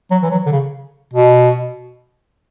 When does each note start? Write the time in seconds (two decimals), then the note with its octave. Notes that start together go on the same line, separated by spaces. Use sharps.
0.11 F#3
0.23 E3
0.31 F#3
0.46 D3
0.52 C#3
1.13 B2